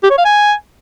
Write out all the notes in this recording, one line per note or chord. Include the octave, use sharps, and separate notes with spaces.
G4
C#5
F5
G#5